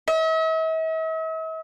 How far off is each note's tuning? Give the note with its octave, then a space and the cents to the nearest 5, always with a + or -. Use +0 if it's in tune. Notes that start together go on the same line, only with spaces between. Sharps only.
E5 -45